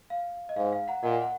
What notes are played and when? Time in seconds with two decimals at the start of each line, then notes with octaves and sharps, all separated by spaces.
0.10 F5
0.49 D#5
0.57 G#2 F5
0.73 F5
0.88 F#5 A#5
1.03 A#2 D#5 F#5
1.22 F#5